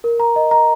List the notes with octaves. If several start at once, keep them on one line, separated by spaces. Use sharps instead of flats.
A#4
A#5
D#5
A#5